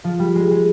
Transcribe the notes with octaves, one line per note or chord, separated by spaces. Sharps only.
F3
G3
G#3
G#3